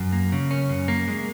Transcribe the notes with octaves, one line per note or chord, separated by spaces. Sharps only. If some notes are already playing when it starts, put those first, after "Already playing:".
Already playing: F#2
A#3
C#3
C#4
F#2
A#3
G#3